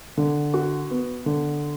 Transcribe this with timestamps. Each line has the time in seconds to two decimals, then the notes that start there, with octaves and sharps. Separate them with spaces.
0.17 D3
0.54 F#4
0.91 B3
1.26 D3